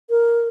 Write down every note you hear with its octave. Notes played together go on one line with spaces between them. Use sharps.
A#4